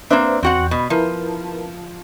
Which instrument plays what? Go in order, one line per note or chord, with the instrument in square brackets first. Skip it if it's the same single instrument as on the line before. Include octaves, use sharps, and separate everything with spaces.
[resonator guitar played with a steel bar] A#3 C4 D4 [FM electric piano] B4 C5 E5
[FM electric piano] E2 G5 [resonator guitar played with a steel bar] C4 F#4 F#5
[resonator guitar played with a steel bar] B2
[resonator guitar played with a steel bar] F3 [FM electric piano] E4 A#4 B4